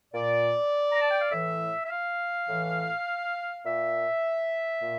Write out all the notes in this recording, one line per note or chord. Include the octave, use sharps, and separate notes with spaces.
A#2 D5
A#5
A5
G5
F5
A2 E3 E5
E5
F5
A2 E3
A#2 E5
A#2